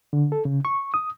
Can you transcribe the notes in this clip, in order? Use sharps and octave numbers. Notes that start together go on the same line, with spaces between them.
D3
A4
C#3
C#6
D#6